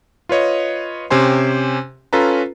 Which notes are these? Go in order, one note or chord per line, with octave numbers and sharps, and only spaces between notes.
F4 B4 C#5 D#5
C3 C#4 G4 C5 G#5 C6
C#4 F4 A4 B4 A#5